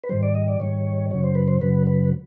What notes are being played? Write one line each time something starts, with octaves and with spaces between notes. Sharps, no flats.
B4
G#2 D#3 G3 C5
D5
D#5
D5
G#2 D#3 G3 C#5
F#2 C#3 F#3 C#5
C5
B4
C5
F#2 C#3 F#3 B4
B4